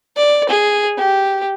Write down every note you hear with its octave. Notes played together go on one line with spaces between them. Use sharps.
D5
G#4
G4